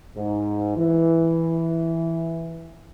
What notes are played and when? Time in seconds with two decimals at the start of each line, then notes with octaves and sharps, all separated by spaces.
0.15 G#2
0.77 E3